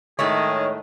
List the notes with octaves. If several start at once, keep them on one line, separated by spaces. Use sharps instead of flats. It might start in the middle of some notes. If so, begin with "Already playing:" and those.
A2 D#3 G#3 A3 G#4 C#5